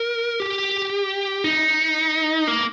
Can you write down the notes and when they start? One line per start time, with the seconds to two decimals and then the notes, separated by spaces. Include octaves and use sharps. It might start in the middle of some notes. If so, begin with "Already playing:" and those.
Already playing: A#4
0.40 G4
1.44 D#4
2.47 A#3